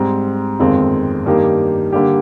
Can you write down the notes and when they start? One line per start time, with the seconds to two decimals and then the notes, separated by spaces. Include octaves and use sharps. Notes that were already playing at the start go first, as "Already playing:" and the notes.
Already playing: G#2 G3 C4
0.60 G1 F2 D#3 G#3 C4
1.26 G2 D#3 A#3 D#4 G4
1.93 D3 G3 A#3 D4 G4